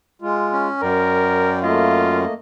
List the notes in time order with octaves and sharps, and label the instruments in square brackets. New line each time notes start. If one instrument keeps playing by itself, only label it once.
[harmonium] G#3 F4
[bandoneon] C#4
[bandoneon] F#2 [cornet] A#4 [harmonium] D5 G5
[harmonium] A3 A#3 D#5 [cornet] F4